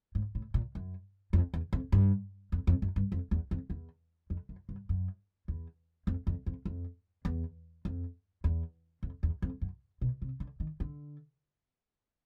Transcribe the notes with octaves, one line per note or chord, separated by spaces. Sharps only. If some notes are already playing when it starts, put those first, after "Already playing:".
G#2
A2
A#2
F#2
F2
E2
F2
G2
F2
F2
F#2
G2
F2
E2
F2
E2
F2
F#2
G2
F#2
E2
F2
F2
F2
F2
E2
F2
E2
F2
E2
F2
F#2
B2
C3
D3
D#3
D3